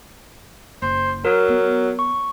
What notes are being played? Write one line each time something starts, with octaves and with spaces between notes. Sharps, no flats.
F#1 C5
F#3 A#4
B3
C#6